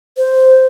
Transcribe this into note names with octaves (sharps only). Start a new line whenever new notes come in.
C5